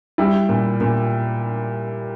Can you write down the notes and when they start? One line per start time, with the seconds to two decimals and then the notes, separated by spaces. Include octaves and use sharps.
0.18 G3 E4
0.49 A#2
0.81 A#2